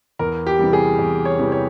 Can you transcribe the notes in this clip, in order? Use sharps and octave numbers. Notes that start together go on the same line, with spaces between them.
E2 A#4
G4
C3 E3 G3
G#4
E2
C#5
C3 E3 G3
C#5